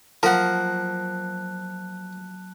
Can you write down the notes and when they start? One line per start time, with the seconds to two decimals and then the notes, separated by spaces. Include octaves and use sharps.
0.23 F3 F#3 A#3 A#4 F#5 A5 F#6